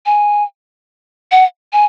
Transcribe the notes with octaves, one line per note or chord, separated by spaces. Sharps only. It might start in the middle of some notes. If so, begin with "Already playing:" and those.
G#5
F#5
G#5